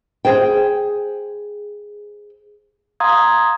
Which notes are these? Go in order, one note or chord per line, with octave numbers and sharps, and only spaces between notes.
G#4 C5 G5
F5 A#5 C6 D#6 G#6